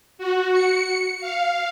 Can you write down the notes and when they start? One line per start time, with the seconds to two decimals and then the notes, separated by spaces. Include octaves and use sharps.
0.18 F#4
0.52 C#7
1.20 F5